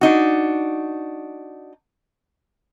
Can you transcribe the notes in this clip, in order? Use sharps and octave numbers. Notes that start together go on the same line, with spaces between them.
D4 D#4 F#4